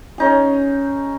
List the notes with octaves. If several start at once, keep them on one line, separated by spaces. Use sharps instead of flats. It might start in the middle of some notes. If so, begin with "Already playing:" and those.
C#4 D#4 G#4